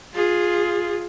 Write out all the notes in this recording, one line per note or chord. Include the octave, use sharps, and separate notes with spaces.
F4 G#4